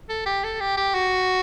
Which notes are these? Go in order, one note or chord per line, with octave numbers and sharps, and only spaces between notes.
A4
G4
A4
G4
G4
F#4